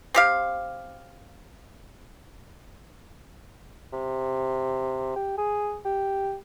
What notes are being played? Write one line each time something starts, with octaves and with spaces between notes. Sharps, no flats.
C4 G4 F5
C3
G4
G#4
G4